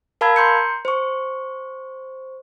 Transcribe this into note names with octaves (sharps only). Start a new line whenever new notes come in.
A#4 F5 A5 B5 E6 G#6
A#5 C6 G6 C#7
C5 C#6